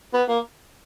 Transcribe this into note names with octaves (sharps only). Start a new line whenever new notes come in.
B3
A#3